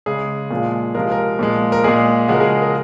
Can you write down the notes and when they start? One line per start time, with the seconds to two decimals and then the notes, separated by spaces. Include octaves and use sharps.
0.06 C#3 G#3 G#4
0.51 A#2 F3 G#3
0.95 C3 F3 G#3 A#4
1.12 A#4
1.39 A#2 F3 G#3
1.72 A#4
1.84 A#2 G#3 G#4
2.28 C#3 F3 G#3 F#4
2.34 A#4
2.40 G#4
2.62 A#4